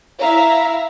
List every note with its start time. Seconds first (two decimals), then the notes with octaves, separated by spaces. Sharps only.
0.20 E4 E5 F5 A#5